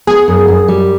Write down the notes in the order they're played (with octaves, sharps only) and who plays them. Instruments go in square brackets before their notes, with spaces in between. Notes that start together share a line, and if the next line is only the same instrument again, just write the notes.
[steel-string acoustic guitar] B3 [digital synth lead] G#4
[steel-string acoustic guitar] F#2
F#2
G3